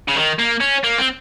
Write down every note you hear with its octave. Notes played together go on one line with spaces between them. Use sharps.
C#3
D#3
A#3
C#4
A#3
C4